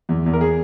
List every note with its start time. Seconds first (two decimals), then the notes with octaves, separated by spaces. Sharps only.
0.09 E2
0.26 E2
0.33 A#4
0.41 G#4